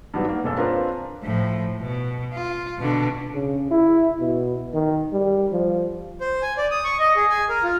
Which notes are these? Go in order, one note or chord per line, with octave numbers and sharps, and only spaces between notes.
G2 D#3 F#3 G3 B3
A#3
E1 F#2 A4
C4 D4 F4 A#4 B4 F5
A2 F3
B2
F4
B2 D3
C#3
E4
B2
D#3
G3
F3
C5
G#5
D5
D#6
C#6
D#5
G#4
G#5
A#4
F4